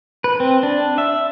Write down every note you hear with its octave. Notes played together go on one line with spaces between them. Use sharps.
B4
C4
D4
E5